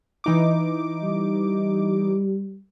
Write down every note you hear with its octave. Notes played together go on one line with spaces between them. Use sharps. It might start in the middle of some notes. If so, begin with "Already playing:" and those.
E3 D#4 D6
G3